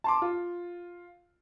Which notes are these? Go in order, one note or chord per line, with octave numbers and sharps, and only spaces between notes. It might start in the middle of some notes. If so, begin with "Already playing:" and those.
A5 C6 D6
F4